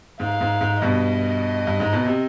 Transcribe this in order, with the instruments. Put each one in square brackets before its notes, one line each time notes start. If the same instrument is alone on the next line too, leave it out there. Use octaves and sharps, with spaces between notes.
[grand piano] G#2 [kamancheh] F5
[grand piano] G#2
G#2
[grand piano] G2 B2 [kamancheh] D#5
[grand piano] G2
G#2
B2
C3